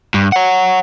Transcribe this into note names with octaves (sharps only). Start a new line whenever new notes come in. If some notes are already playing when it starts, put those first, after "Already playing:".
G2
C#5 F#5